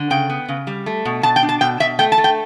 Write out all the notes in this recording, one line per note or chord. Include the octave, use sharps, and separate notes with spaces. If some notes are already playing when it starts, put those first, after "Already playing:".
Already playing: D3
C#3 G5
B3
C#3
G3
A3
B2
B2 A5
G5
D4
A5
B2 G5
B2 E5
A3 G5
A5
A3
G5